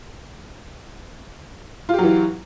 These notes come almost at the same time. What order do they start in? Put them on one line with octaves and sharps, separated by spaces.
F4 G4 F#3 E3